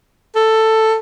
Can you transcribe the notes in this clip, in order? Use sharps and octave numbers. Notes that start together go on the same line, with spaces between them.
A4